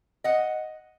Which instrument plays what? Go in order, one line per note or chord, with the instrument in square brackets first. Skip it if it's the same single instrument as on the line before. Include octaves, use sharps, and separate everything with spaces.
[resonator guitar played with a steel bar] D#5 F#5